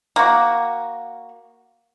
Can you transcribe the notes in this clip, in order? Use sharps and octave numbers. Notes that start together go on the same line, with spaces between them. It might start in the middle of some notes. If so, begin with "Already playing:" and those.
A#3 F#4